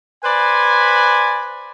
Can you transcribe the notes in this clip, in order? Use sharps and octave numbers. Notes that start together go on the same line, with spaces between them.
B4 C5 D5 G#5 B5